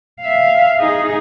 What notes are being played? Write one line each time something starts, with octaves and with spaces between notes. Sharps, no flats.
E5 F5
D#4 G#4